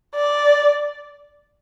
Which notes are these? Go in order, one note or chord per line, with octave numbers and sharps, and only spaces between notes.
D5